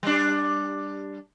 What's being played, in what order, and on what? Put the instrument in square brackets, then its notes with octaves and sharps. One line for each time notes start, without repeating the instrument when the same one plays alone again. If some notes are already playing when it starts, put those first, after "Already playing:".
[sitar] G3 D4